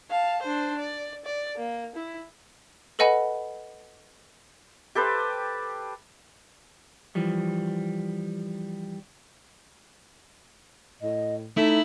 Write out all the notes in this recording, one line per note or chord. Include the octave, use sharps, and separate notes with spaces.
F5 A5
D4 C5
D5
D5
A#3
E4
A4 B4 D#5 F#5 G#5 B5
G4 A4 B4 C5
E3 F3 G3
A2 D#5
A3 D#4 E4